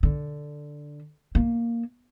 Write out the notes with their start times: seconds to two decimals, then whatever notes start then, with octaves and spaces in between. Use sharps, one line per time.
0.03 D3
1.35 A#3